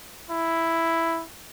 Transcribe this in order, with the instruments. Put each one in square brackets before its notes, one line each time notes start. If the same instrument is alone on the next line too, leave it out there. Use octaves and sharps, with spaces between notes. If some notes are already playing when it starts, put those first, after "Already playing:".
[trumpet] E4